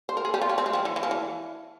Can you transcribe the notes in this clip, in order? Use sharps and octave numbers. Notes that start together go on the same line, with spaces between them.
C5
A#4
G#4
G4
F4
C#4
C4
G#3
F3
E3
E3
F3
E3